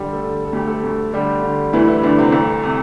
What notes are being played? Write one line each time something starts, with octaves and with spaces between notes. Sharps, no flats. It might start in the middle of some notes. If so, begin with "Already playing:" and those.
Already playing: D3 G3 G4
A3 A4
D3
A4
D2 G4
A3 A4
D2
D3 G3 G4
D3
D2 E3 E4
E3 E4
D2 D3 D4
C3 C4
C2 A3
C3